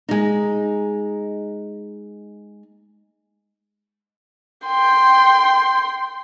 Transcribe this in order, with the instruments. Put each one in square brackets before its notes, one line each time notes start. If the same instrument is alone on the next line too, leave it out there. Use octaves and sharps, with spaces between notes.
[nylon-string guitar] G#3 D#4
[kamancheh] G5 C6